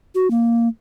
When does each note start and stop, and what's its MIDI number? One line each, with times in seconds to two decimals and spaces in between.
0.15 0.30 66
0.31 0.68 58